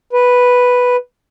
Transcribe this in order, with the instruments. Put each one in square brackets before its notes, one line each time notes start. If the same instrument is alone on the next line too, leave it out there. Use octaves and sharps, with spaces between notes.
[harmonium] B4